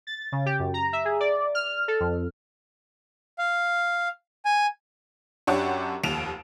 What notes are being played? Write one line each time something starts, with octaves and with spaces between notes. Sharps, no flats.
A6
C#3
G4
F#2
A#5
E5
G#4
D5
F6
A4
F2
F5
G#5
F#2 D4 G4 C#5 F#5 C#6
F1 D#2 D7 E7 F7